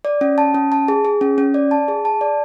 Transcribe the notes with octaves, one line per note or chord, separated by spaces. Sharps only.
D5
C#4
A5
C#4
A5
G#4
G#4
C#4
C#4
D5
A5
G#4
A5
D5